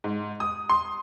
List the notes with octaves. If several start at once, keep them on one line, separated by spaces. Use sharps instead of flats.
G#2
D#6
C6